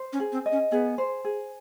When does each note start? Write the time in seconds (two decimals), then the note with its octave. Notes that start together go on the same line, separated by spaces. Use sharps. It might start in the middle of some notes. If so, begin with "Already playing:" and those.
Already playing: C5
0.13 C#4
0.20 G#4
0.32 C4
0.46 D#5
0.52 C#4
0.71 B3 G#4
0.98 C5
1.25 G#4